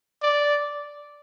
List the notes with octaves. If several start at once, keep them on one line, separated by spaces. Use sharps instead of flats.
D5